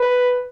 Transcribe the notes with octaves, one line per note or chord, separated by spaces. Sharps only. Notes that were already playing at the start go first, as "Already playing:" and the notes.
Already playing: B4